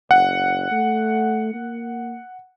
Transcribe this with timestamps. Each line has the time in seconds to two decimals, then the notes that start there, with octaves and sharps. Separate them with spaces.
0.11 F#1 F#5
0.71 A3
1.54 A#3